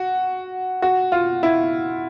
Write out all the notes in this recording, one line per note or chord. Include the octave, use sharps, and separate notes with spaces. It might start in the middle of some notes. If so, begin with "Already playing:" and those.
Already playing: F#4
F#4
F4
E4